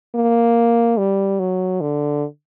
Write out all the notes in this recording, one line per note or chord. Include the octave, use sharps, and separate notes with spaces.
A#3
G3
F#3
D3